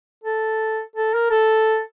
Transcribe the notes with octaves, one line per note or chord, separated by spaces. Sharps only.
A4
A4
A#4
A4